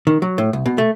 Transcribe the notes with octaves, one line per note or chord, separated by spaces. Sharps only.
D#3
F#3
A2
C2
B2
A3